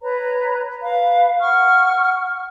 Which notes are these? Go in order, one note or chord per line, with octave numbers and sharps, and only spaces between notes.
B4 C#5 A#5
B4 F5
F#5 C#6 F6